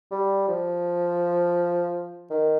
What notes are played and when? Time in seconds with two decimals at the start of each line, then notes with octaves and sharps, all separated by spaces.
0.11 G3
0.48 F3
2.31 D#3